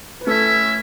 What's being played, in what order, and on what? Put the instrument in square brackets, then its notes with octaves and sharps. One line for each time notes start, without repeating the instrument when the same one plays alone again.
[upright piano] B4
[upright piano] A3 A4 [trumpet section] C#4 E4 C#5 E5